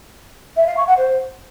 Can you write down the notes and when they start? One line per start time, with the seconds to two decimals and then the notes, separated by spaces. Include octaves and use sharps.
0.56 E5
0.67 F5
0.77 C#6
0.87 F#5
0.97 C5